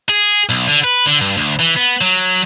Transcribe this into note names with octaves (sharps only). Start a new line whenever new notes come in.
G#4
B1
D3
B4
D3
G2
D2
E3
B3
F#3